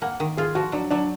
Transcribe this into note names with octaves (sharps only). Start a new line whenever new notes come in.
A#3 F#5
D#3
F4 G#4
F3 F#4
F#3 D4
F#3 D4